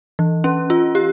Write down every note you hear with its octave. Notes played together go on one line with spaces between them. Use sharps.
E3
C#4
F4
G4